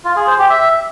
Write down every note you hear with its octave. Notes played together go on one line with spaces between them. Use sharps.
F4
G#4
C5
G4
E5